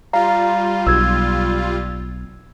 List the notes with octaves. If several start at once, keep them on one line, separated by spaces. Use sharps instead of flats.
G3 F4 F5 A#5
B1 E6 G#6